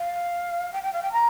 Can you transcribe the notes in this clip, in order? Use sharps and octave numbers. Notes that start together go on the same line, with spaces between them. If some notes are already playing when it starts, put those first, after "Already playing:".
Already playing: F5
G5
G5
F5
G5
A#5